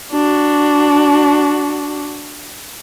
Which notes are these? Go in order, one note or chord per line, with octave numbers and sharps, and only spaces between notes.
D4 F#4